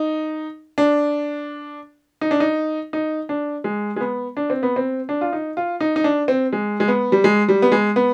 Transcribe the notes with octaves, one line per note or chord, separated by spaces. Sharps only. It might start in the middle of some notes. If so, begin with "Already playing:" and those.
Already playing: D#4
D4
D#4
D4
D#4
D#4
D4
G#3
G#3
B3
D4
C4
B3
C4
D4
F4
D#4
F4
D#4
D#4
D4
C4
G#3
G#3
B3
G3
G#3
G3
B3
G#3
B3